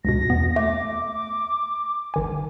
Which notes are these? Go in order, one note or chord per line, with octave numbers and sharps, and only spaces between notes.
C#2 G2 B2 A#6
E2 B3
A3 D6
G#1 D#3 G#5